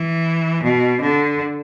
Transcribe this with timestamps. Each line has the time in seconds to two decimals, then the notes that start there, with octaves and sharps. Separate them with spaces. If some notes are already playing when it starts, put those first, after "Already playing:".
Already playing: E3
0.63 B2
1.01 D3